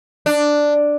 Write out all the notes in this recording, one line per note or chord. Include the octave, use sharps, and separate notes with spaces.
D4